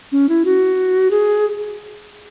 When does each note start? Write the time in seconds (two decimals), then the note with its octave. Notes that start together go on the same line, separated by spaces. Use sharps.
0.12 C#4
0.29 E4
0.45 F#4
1.11 G#4